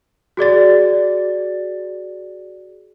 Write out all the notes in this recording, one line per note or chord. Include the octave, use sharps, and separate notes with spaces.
F#4 G#4 D5 A6